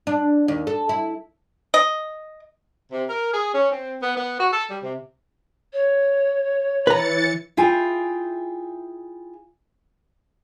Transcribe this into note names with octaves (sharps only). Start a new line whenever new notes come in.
D4
D#2
A4
E4
D#5
C3
A#4
G#4
C#4
C4
B3
B3
F#4
A4
G3
C3
C#5
E3 B4 A#5 A6 C#7
E4 F4 G#4 G5 G#5